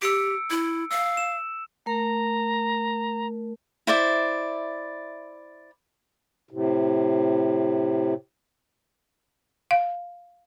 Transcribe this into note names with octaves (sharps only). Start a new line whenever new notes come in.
G4 E6 C#7 D7
E4
F5 E6
E7
A3 A#4 A#5
E4 C5 D5 E5
A2 C3
F5